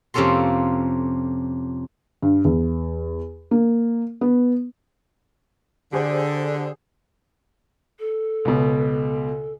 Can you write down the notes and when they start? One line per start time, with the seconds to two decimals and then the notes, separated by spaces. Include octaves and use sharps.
0.14 F2 C3 A#3 C#4 A4 C6
2.22 G2
2.45 E2
3.51 A#3
4.21 B3
5.93 D3 G4 G#4 C5
7.99 A4
8.45 C#2 B2